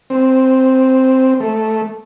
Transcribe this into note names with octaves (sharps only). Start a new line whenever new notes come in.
C4
A3